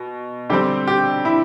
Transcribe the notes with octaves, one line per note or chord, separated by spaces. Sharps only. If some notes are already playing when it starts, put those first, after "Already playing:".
Already playing: B2
D3 G3 C4 G4
G4
E4